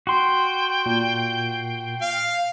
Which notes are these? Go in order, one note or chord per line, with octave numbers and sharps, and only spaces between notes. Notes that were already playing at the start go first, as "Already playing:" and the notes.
F#4 G5 C6
A#2
F5